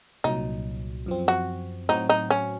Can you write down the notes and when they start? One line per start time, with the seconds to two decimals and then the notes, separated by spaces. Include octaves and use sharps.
0.24 C2 A#2 F#3 D#4
1.06 F#2 F3 C4
1.28 F#4
1.89 A2 F#3 C4 D#4 F#4
2.09 D#4
2.30 C#4